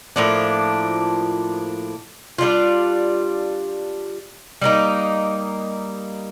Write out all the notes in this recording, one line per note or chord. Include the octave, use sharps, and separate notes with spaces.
A2 F3 A#3 D4
G3 D4 F4
G3 A#3 D#4